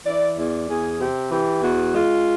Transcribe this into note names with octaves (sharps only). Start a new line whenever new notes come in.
E3 D5
E2 D5
E2 G#4
C3 G4
E3 G4
E2 F#4
G#3 F4